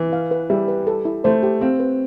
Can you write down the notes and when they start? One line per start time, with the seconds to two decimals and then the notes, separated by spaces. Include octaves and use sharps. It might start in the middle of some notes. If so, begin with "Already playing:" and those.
Already playing: E3
0.13 F5
0.31 B4
0.50 G3 E5
0.68 B4
0.87 A4
1.05 E4
1.24 A3 C5
1.43 G4
1.61 C4 F5
1.80 B4